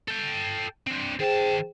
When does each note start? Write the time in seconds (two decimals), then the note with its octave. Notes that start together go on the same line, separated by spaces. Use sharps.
0.08 A4 G5
0.87 C4 D4
1.19 D#3 G#4 C5 G5 A5